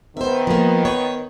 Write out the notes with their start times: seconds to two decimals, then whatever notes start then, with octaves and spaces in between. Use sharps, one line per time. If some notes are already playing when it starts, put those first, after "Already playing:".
0.17 D#3 B3 C5 E5
0.47 F3 A#3
0.85 C#5